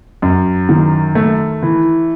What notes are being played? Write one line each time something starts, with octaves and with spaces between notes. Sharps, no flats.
F#2
D#3
A3
E3